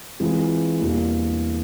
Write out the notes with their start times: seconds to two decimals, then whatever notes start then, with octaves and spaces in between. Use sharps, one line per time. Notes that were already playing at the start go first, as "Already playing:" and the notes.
0.20 E3 G#3 C4 F4 G#4
0.81 E2 B2 G3 A#3 D4